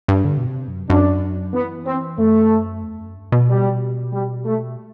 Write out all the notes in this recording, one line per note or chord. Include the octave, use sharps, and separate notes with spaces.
G2
D3
B2
C3
F#2
F#2 D4
E3 B3
C4
F#2 A3
E2
F#2
G2
B2
G3
G3
A3